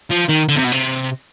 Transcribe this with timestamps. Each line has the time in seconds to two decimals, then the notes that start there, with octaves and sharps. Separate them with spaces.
0.10 F3
0.28 D#3
0.49 D3
0.56 C3
0.64 B2
0.72 C3